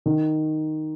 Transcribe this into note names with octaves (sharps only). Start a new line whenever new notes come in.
D#3